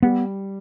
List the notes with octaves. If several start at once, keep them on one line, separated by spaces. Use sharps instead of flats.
G3 B3